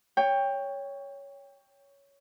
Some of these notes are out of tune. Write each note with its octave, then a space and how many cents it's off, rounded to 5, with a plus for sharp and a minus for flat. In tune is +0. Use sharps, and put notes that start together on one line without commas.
C#5 +10 G5 +20